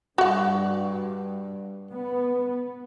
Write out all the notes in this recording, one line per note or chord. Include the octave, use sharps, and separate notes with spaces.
G2 F#4 F#5
B3